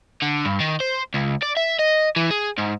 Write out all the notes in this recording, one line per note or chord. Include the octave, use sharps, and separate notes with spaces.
D3
G2
D#3
C5
C#2
D5
E5
D#5
E3
G#4
G#2